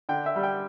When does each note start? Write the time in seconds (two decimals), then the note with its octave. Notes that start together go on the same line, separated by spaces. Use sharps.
0.09 D3 G5
0.26 E5
0.36 G3
0.43 G5